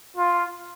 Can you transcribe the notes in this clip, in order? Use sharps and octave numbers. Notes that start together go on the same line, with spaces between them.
F4